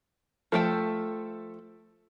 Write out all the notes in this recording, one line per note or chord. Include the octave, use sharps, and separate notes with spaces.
F3 A3 A4 G5